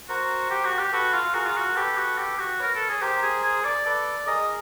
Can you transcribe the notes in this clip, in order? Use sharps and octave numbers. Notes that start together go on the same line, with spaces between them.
F#4 A#4 C5
G4
F#4
G4
F#4 A4 B4
F4
F#4 G#4 A#4
F4
F#4
G4 A4 B4
F#4
G4
F#4
A#4 B4 C#5
A4
G#4
G4 A#4 C5
G#4
G#4
D5
A4 B4 D5
G#4 A#4 D#5